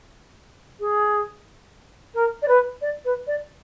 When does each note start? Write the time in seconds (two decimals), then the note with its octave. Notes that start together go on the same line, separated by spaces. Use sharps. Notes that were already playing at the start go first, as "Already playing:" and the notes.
0.79 G#4
2.14 A#4
2.42 D5
2.48 B4
2.81 D5
3.05 B4
3.27 D5